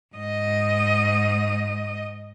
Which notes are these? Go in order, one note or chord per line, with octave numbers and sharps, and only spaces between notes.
G#2 D#5